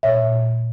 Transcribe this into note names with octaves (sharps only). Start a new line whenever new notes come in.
A#2 C#5 E5
A#2